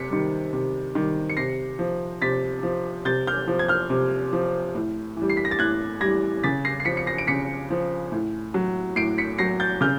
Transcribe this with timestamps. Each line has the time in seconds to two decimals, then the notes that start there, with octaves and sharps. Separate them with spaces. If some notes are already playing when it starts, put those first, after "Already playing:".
Already playing: C3 B6 C#7
0.10 D#3 G3
0.53 C3
0.95 D#3 G3
1.30 C#7
1.37 C3 A#6 C7
1.79 F3
2.22 C3 A6 B6
2.63 F3
3.05 C3 G6 A6
3.27 F6 G6
3.48 F3
3.59 G#6
3.68 F6 G6
3.90 C3
4.33 F3
4.75 A2
5.17 E3 G3
5.30 C7
5.37 B6
5.45 A#6
5.51 A6
5.59 A2 F#6 G#6
6.01 E3 G3 G#6 A#6
6.43 C#3 A6 B6
6.65 A#6 C7
6.80 C7
6.85 F3 B6 C#7
6.97 C#7
7.07 A#6 C7
7.18 D7
7.27 C#3 B6 C#7
7.70 F3
8.12 A2
8.54 F#3
8.96 A2 C7 D7
9.18 B6 C#7
9.38 F#3 A#6 C7
9.60 G6 A6
9.81 C#3 F6 G6